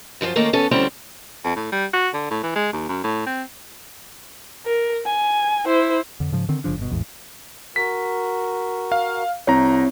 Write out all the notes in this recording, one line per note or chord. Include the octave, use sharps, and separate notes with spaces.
F#2 F3 F4 C5
D#3 A3 A#3 C#4 F4 A4
E2 B3 C#4 A4
D2 G3 C4 C#4 E4 A4
F2
A2
G3
F#4
D3
A2
E3
G#3
D#2
F#2
A2
C4
A#4
G#5
E4 C5
F2 D3
G#2 C#3 F3
D3 D#3 C4
G1 C#3 F3 D4
G1 B2
A1 E2 G#2
F#4 A#4 B6
F5
C2 C4 E4 C#5 A#5